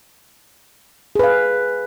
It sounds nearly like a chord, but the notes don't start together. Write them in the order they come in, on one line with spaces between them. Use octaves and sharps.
G#4 B4 F5